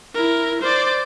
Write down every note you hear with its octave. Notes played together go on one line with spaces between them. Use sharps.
E4 A#4
C5 D5